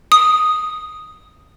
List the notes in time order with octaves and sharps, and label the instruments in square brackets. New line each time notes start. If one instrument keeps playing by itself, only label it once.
[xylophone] D#6